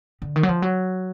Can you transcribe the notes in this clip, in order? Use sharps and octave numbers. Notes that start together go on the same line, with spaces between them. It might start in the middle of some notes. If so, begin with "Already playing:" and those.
D3
D#3
F#3
F3
F#3